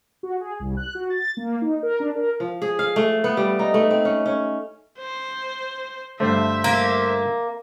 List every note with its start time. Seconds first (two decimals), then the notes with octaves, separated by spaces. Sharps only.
0.23 F#4
0.41 G#4
0.60 C2
0.77 F#6
0.95 F#4
1.10 A6
1.37 A#3
1.62 D#4
1.83 A#4
2.00 D4
2.16 A#4
2.40 F3
2.62 G#4
2.79 F5
2.96 A3
3.24 B3
3.37 G3
3.59 D#4
3.74 A3
3.91 C4
4.05 C#4
4.26 C#4
5.00 C5
6.20 G2 D3 A3 C5 E5
6.64 A#3